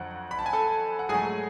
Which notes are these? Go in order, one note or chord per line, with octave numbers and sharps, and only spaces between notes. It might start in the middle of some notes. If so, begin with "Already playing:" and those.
Already playing: F2 D3 F#3 F#5
B5
A5
G#5
A4 A5
F#5
G#2 F#3 A3 G#4 G#5